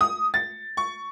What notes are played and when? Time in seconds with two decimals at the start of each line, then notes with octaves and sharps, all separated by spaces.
0.01 D#6
0.34 A6
0.77 C#6